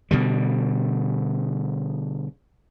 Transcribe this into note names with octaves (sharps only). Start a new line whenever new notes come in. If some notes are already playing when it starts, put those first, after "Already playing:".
B2 D3 G3